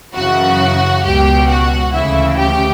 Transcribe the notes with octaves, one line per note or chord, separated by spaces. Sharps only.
F#2 C#3 E3 F#4 F#5
C#2 B2 G4 G5
F#4 F#5
D2 C#3 E3 E4 E5
G4 G5